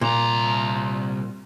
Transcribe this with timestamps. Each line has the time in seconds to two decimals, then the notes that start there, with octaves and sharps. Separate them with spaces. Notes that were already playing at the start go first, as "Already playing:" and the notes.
0.01 C2 A#2 A#5